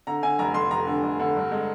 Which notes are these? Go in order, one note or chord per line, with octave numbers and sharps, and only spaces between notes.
D3 A#5
D3 G#5
F1 A#5
F1 C6
F1 A#5
D3
F1
D3
G2
G#3